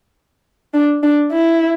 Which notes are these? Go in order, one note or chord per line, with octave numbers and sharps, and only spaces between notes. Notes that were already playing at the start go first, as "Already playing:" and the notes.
D4
D4
E4